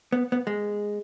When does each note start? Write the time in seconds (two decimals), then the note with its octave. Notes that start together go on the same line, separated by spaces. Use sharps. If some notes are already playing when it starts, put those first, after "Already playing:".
0.12 B3
0.32 B3
0.47 G#3